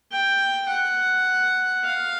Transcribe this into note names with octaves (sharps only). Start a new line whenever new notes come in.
G5
F#5
F5